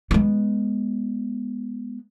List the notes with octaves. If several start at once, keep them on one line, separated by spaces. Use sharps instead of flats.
G#3 B3